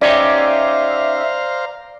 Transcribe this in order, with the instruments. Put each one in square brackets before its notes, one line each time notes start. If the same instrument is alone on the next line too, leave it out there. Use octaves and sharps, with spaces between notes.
[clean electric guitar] C#4 D#4 G4 [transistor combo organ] C5 F5 A#5 [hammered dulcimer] D5 [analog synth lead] E5